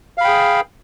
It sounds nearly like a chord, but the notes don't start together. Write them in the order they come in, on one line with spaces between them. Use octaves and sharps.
F5 B5 G5 G#4